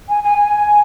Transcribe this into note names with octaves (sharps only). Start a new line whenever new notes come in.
G#5
G#5
G#5